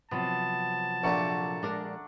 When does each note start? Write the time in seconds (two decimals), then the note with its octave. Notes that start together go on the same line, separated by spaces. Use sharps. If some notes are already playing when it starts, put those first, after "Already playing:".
0.11 C3 F3 F#3 B3 A5
1.04 A#1 A#2 A3 F#5 A#5
1.63 G#3 D4 A#4 D5